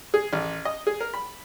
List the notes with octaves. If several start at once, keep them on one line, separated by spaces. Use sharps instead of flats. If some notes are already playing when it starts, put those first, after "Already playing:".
G#4
A1
D#5
G#4
A#4
B5